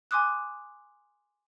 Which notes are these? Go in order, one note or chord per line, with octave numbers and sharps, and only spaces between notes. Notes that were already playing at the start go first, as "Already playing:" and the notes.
G#5 C6 D6 D#6 F#6